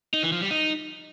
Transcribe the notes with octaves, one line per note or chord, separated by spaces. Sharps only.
D#4
E3
F3
G3
D#4